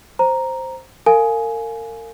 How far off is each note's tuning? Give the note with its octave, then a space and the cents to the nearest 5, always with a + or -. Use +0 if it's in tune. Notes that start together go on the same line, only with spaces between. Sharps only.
C5 +0 A#5 +0
A#4 -40 F5 +0 G#5 +15